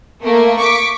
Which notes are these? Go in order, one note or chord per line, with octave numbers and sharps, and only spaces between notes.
A3 A#3
C#6 D6 B6